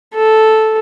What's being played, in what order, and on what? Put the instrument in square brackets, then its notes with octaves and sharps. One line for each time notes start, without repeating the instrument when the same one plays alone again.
[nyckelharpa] A4